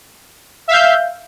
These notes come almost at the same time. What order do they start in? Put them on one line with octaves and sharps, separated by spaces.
E5 F5 G6